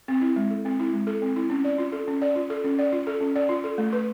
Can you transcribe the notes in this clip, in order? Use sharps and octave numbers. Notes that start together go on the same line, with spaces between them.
C4
E4
G#3
A4
C4
E4
G#3
A4
C4
E4
C#4
D5
F4
A4
C#4
D5
F4
A4
C#4
D5
F4
A4
C#4
D5
F4
A4
A3
B4